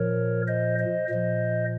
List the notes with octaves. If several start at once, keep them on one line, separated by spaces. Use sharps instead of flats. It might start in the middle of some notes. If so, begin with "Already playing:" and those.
Already playing: A#2 F3 A#4 C#5
C5 D#5
C5 D#5
A#2 F3 C5 D#5